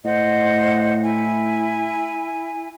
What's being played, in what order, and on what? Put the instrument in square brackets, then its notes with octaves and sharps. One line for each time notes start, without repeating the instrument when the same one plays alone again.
[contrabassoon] A2 [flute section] C5 D#5 F#5
[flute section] E4 G#5